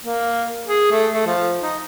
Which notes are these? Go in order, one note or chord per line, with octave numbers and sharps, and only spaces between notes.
A#3
G#4
A3
A3
F3
D#4